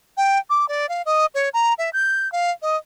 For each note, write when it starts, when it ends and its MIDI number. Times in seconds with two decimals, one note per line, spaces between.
0.17 0.38 79
0.50 0.68 86
0.68 0.89 74
0.89 1.02 77
1.06 1.26 75
1.35 1.49 73
1.54 1.74 82
1.78 1.90 76
1.93 2.30 91
2.32 2.51 77
2.62 2.76 75